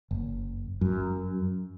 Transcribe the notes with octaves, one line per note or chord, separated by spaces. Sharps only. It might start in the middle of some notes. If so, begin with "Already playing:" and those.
F#1
F#2